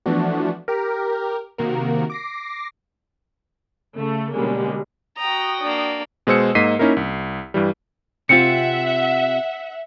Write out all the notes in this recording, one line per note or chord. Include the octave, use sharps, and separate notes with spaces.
E3 F3 A3 B3 D4 F#4
G4 A#4
C3 D#3 A#3 F#4 A#4
D6 A#6 C7
C#3 A3
B2 D3 G3 G#3 A#3 C#4
F#4 G5 A#5 D#6
A#3 D4
B2 G#3 C5 E6 C#7
G#2 A#3 D#5 B6 C7 D#7
A#3 C#4 D#4 E4 A#4
C2
G2 E3 G3
C3 C4 F4 E5 F#5 C#7